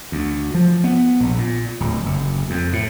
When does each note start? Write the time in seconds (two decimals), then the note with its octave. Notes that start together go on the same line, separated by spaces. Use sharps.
0.12 D2
0.54 F3
0.84 B3
1.20 A#1
1.38 A#2
1.80 D1
2.06 F#1
2.50 F2
2.73 A2